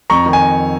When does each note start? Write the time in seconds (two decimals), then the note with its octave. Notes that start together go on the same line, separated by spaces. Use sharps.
0.10 F2 A#5 C#6
0.26 D#3
0.33 G#5